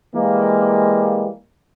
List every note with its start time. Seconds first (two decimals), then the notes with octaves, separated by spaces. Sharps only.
0.15 E3 G3 G#3 A#3